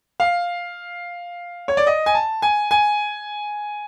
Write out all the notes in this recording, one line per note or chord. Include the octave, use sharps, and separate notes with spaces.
F5
C#5
D5
D#5
G#5
A5
G#5
G#5